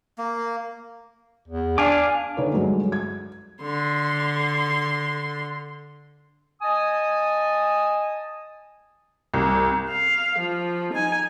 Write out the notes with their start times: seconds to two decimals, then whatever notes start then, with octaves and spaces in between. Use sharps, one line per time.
0.18 A#3
1.48 E2
1.78 D4 F5 G#5 D6
2.37 D3 D#4 A4 B4 C#5
2.53 G2 F#3 G#3
2.92 G#6
3.62 D3 C6
6.62 D#5 G#5 A5 D#6
9.34 C2
9.90 F5
10.38 F3
10.93 D#4 G#5